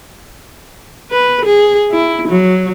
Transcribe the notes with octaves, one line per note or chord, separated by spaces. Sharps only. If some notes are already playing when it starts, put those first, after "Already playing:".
B4
G#4
E4
F#3